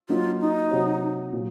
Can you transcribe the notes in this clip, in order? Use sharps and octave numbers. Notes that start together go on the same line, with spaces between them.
F#3 A#3 D#4 F4
D#4
C3 F#3 C4 F#4 C#5
A#2 F#3